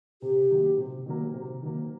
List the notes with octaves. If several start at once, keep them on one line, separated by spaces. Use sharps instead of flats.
C3 G4
D#3 F#3 A#3
C3
D#3 F#3 A#3
C3
D#3 F#3 A#3